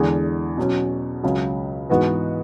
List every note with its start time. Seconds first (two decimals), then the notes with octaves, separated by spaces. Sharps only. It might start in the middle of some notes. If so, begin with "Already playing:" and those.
Already playing: E2 D3 G#3 D4 G#4
0.57 B2 F#3 C#4
1.24 C#2 C#3 F#3
1.90 G#2 E3 B3 F#4 B4